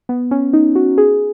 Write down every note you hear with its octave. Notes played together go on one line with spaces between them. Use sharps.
B3
C#4
D#4
F#4
G#4